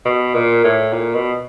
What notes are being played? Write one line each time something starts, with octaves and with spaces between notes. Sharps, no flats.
B2
A#2
A2
A#2
B2